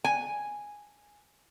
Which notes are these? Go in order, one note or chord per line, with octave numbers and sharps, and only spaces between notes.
G#5